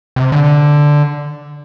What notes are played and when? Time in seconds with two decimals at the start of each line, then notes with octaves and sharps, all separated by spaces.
0.16 C3
0.32 D3